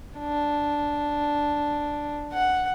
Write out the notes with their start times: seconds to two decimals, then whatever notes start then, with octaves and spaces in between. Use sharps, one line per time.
0.19 D4
2.33 F#5